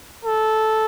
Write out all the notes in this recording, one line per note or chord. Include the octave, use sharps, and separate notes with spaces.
A4